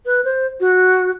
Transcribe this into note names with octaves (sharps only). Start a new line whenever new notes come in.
B4
C5
F#4